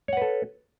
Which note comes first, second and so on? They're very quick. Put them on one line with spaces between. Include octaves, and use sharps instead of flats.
C#5 F#5 B4 A4